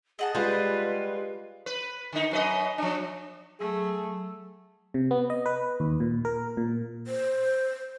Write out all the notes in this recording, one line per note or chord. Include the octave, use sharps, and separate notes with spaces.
G#4 D#5 F#5 A5
G3 G#3 F4 B4
B4
D3 D#4
F#2 B4 D#5
F3 D4
F#3 A3 G#4 E6
C3
B3
D#5
B4
D#2
A#2
A#4
A#2
C5